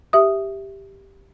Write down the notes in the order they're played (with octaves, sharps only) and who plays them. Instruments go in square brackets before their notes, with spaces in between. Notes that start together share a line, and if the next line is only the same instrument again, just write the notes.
[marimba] G4 E5 D#6